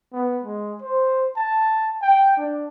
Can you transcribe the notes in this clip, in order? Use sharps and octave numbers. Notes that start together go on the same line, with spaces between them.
B3
G#3
C5
A5
G5
D4